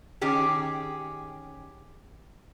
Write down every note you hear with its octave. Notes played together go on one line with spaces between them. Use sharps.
D#3 C#4 G4 G#4